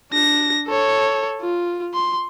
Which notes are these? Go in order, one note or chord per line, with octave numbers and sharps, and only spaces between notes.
D4 A#6
A4 C#5
F4
C6